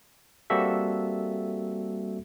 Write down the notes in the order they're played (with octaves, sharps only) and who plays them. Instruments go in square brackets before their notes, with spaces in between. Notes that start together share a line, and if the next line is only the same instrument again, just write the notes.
[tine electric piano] G3 A#3 C4 F#4 A4 E5